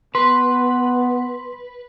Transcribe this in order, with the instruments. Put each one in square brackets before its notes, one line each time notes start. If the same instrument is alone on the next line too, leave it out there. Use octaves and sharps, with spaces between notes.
[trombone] B3 [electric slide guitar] B4 [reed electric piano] C6